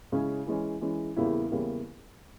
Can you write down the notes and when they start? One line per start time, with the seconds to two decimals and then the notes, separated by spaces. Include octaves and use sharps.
0.12 C#3 G#3 C#4 E4 G#4
0.47 E3 G#3 C#4
0.81 E3 G#3 C#4
1.16 E2 C#3 G3 A#3 E4
1.50 E2 C#3 G3 A#3 E4